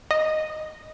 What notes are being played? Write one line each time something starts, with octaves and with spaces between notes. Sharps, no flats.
D#5